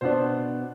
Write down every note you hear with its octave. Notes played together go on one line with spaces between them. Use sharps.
B2 B3 D4 C5